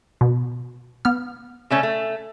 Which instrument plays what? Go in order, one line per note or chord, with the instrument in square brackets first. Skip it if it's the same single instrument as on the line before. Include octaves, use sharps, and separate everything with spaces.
[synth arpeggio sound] B2
B3 F6
[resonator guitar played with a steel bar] C#3 A3 C#4
A3